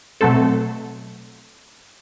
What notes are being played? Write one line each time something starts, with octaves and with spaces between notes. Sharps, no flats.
B2 F#3 A3 C4 A4